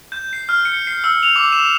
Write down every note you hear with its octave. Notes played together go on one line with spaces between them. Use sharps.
G6
C7
F6
C#7
C7
E6
F7
D6
E7